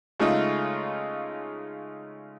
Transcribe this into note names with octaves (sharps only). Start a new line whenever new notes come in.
C#3 G#3 A3 D#4 F4